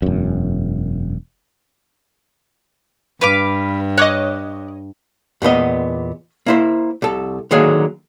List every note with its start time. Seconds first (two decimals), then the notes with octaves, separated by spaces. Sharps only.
0.02 E1 F#2
3.21 G2 B4 F5 D6
3.98 C#5 D#5 D6 F#6
5.42 E2 A#2 B3 D#5
6.46 A#3 E4 C5
7.02 C2 A4
7.51 D3 D#3 F#3 A#3 G#4